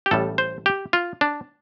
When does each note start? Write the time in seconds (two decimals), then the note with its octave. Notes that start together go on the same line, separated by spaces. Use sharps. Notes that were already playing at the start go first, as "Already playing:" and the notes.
0.06 G4
0.11 A1 A2 G3 A4
0.38 C5
0.66 G4
0.93 F4
1.21 D4